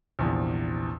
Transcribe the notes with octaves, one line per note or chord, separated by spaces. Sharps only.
A#1 E2 C3